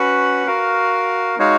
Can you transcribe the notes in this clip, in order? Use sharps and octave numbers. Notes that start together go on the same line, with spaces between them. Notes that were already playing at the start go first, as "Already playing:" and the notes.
Already playing: C#4 F#4 B4 F#5
F#4 A#4 F5
G#3 D#4 F#4 C#5 F5